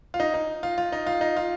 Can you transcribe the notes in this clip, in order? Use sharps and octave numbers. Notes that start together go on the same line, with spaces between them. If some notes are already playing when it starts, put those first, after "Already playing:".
F4
D#4
D#4
F4
F4
D#4
F4
D#4
F4